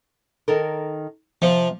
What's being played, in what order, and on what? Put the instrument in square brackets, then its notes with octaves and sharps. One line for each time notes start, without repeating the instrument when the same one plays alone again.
[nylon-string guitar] D#3 A4 A#4
[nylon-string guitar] C3 [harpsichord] F3